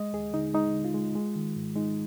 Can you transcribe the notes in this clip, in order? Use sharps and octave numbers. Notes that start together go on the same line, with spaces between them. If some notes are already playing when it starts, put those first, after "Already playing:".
Already playing: G#3 D#5
D#2 G#4
D3 D#4
G#3 D#4
D3
F4
G#3
G#3
D#3
G#2
G#3 D#4